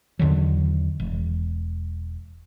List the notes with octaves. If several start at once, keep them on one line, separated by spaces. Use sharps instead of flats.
E2 D3 D#3 F#3
E1